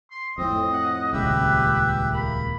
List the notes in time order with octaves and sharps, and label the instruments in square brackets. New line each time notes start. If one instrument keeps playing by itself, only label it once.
[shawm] C6
[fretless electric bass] F2 A2 [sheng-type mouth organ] C4 [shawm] D#5
[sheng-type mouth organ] F#5
[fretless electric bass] D#1 C#2 C#3 [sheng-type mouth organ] G4 E5 [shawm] B4
[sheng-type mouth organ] A#3 [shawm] B5